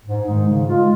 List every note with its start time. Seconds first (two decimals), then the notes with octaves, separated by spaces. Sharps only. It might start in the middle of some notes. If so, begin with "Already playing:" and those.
0.05 G#2
0.26 D#3 G#3 D#4
0.47 C#3
0.67 G#3 F4